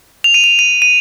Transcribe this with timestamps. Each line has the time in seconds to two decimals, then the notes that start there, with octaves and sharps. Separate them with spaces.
0.24 F7
0.34 D#7
0.44 F7
0.59 D#7
0.82 D#7